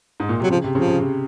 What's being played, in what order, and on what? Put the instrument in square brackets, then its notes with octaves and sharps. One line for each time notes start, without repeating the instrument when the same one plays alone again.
[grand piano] G#2
A#2
[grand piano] C3 [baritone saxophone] F#3
[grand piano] C#3 [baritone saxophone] F3
[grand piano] C3
[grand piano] C#3 [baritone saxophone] F3
[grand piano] C#3
C3